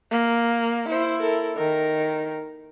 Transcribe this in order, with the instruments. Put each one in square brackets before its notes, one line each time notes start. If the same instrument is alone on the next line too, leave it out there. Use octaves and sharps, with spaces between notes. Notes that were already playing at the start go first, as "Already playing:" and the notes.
[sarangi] A#3
[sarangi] E4 [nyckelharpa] C5
[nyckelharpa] A4 A#4
[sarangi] D#3 [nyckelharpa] A#4